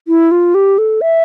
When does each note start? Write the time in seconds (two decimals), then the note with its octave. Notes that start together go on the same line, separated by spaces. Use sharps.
0.08 E4
0.31 F4
0.55 G4
0.78 A4
1.01 E5